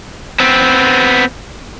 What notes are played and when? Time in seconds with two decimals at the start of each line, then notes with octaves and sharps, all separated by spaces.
0.40 B3 C4